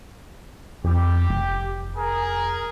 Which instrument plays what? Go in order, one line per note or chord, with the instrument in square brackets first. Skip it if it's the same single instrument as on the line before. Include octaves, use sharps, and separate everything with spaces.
[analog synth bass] F2 [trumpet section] G4
[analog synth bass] F1
[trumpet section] G#4 A#4